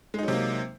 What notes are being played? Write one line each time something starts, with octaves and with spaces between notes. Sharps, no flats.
C3 F#3 G#3 A#3 D#4